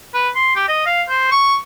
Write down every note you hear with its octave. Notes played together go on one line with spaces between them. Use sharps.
B4
C6
G4
D#5
F5
C5
C#6